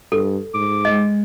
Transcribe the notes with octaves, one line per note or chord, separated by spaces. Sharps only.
G2 A4
G#2 D6
G#3 D#5